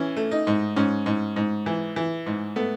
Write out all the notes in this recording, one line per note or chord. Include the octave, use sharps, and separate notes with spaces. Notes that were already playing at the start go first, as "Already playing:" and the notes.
Already playing: E3 C#4
A3
D#4
G#2
G#2 C#4
G#2
G#2
E3
E3
G#2
A3 B3